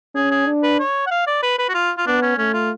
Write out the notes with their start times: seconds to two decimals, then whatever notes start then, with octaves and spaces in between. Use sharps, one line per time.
0.15 C#4 G#4
0.31 G#4
0.47 D4
0.63 B4
0.79 C#5
1.06 F#5
1.11 F5
1.27 D5
1.43 B4
1.59 B4
1.69 F#4
1.74 F4
1.98 F4
2.07 B3 D4
2.22 C#4
2.38 A3 C#4
2.54 F4